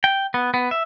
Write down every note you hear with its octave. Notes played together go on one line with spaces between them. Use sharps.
G5
B3
B3
E5